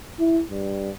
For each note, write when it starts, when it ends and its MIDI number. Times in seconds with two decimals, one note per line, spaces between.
0.19 0.41 64
0.50 0.90 43